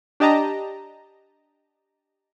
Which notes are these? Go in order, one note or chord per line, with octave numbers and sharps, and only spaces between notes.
D4 G4 D#5 A5 A#5